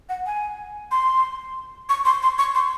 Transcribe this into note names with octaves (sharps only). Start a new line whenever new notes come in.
F#5
G#5
C6
C#6
C6
C6
C#6
C6